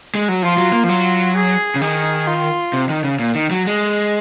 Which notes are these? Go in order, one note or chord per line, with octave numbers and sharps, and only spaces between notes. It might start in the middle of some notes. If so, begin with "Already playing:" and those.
G#3
F#3
F3 F4
F#3
A#3
F3
F#3 F4
G#4
C#3
D#3 G#4
F4
C3
D#3
C#3
A#2
D#3
F#3
G#3